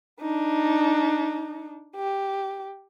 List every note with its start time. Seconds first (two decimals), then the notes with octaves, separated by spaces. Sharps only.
0.21 D4 D#4
1.96 G4